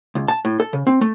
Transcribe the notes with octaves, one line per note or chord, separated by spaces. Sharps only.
C#2
A5
A2
A4
C#3
C4
A3